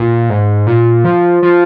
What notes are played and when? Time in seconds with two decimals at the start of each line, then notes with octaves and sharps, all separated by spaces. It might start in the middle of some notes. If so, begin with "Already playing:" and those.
Already playing: A#2
0.30 G#2
0.67 A#2
1.04 F3
1.43 F3